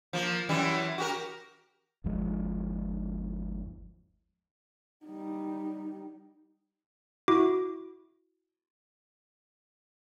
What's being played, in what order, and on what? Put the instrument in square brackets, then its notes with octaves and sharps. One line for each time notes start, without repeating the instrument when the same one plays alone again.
[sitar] F3 A#3
F#2 E3 G3
F#4 G4 A#4
[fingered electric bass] G1 D#2 F3 G#3
[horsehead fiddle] G3 D#4
[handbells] E4 F#4 D6